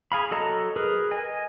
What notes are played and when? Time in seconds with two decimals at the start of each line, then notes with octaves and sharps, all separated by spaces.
0.12 G#4 F5 B5
0.31 F#3 A4 D#5 A5 A#5
0.76 G#4 A#4 B4
1.11 D#5 G#5